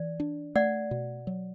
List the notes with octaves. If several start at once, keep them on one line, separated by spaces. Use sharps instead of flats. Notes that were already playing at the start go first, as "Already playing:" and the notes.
Already playing: E3 D5
D4
A3 D5 F#5
B2
F#3